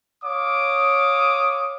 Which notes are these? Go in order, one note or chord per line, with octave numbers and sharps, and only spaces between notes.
C#5 F5 D6 D#6